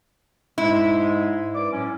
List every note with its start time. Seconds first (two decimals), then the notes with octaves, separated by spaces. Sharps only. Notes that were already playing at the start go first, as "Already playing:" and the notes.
0.58 G#2 G#3 E4
1.55 G2 D5 D6
1.72 A2 F#3 C#4